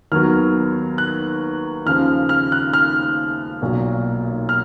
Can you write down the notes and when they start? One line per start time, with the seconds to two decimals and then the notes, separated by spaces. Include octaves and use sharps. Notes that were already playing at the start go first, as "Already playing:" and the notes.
0.12 D#2 D#3 F#3 B3 F6
0.98 F#6
1.86 D#2 C#3 F3 F6
2.29 F6
2.52 F#6
2.73 F6
3.62 B1 A#2 F#3
4.49 F6